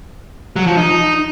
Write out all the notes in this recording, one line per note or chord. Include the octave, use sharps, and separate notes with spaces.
F#3
F3
D#4